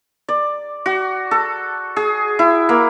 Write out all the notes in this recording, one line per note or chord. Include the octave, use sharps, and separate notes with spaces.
D5
F#4
A4
G#4
E4
A#3